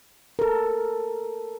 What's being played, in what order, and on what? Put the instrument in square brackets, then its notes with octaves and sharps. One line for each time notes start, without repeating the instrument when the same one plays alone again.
[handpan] A4 A#4